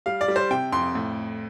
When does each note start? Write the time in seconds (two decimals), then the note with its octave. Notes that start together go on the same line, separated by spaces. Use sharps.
0.06 G3 F5
0.21 D5
0.28 G3
0.36 C5
0.51 C3 G5
0.72 F2 C6
0.95 A2